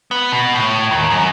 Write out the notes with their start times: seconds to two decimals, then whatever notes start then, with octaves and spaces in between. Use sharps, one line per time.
0.11 B3
0.32 B2
0.55 A2
0.91 D#2
1.10 F#2